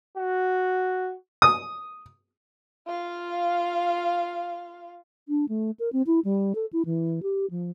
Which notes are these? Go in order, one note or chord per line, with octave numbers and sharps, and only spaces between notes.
F#4
D#6
F4 F5
D4
A3
A#4
C4
E4
G3
A4
E4
E3
G4
F3